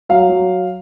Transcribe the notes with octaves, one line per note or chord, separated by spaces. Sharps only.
F#3 F5
F#3